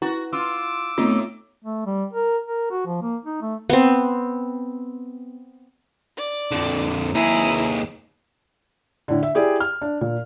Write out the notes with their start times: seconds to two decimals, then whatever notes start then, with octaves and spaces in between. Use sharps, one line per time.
0.02 E4 F#4 B4
0.33 F4 D6 E6
0.98 A2 A3 B3 C4 D#4 F4
1.64 A3
1.86 G3
2.13 A#4
2.46 A#4
2.71 F#4
2.86 F3
3.02 A#3
3.25 D#4
3.41 A3
3.70 B3 C4
6.17 D5
6.51 F2 D3
7.14 D#2 E4 G#4 A#5
9.08 A2 D3
9.23 E5
9.35 E4 G4 G#4 D5
9.60 F6
9.82 D4
10.01 A#2